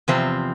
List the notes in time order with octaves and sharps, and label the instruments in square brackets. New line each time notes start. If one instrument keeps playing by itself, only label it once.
[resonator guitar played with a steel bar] E2 C3 F3 C4